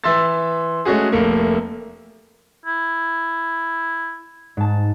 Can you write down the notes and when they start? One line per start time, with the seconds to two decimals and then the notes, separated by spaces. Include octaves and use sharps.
0.04 E3 E5 C6 E6 A6
0.85 G#3 A3 C#4 F#4 G#4
1.12 F1 A3 A#3
2.65 E4
4.57 G#2 A5